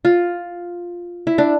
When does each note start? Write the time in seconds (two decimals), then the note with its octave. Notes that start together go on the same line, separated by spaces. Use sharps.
0.05 F4
1.27 E4
1.38 D4